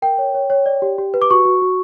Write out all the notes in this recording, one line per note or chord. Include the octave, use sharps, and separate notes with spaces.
A#4 G5
C#5
C#5
C#5
D5
G4
G4
B4
D6
F#4 C#6
F#4
F#4